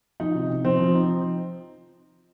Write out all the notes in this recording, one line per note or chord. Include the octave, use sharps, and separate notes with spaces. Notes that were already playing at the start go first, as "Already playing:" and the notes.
F3 D#4
C3
C3
F3 C4
F3
D#4